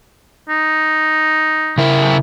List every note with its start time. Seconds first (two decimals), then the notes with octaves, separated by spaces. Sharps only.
0.49 D#4
1.78 C#3 E4 A#4